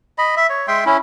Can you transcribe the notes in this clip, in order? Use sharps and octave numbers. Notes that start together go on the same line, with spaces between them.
D#5 B5
E5
C#5
G#3 E5 G5 C6
C#4 E4